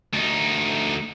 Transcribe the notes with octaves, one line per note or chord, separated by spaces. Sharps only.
D2 D#4